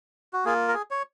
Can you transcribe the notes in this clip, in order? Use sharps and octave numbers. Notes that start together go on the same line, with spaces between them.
F#4
A#3 F4 G#4
A#4
G#4
C#5